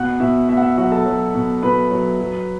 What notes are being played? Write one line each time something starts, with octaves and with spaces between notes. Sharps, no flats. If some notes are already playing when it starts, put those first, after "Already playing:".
Already playing: B2 F#5 F#6
B2 E5
B2 E5
F#5
E5
F#3 F#4 F#5
A4 A5
F#3
B2
B2 B4 B5
F#3
F#3